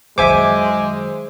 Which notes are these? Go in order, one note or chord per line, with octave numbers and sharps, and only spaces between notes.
F#2 D#3 G#3 C5 E5 G#5 D6